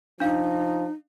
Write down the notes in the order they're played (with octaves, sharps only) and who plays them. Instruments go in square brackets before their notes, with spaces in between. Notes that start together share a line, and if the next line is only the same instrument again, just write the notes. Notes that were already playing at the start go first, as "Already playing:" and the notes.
[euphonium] F3 [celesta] D4 F5 [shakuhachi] D#4